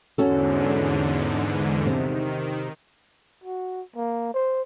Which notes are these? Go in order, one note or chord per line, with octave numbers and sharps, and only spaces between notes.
E2 G#2 D3 C#4 F#4 A4
C3 D#3
F#4
A#3
C5